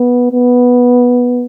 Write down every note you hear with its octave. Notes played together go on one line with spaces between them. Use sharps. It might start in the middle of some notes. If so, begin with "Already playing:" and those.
Already playing: B3
B3